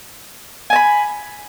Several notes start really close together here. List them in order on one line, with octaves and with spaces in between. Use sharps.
G#5 A5 B5